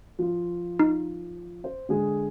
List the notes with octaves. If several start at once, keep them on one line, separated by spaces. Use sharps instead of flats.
F3 F4
D#4
C5
D3 G#3 G#4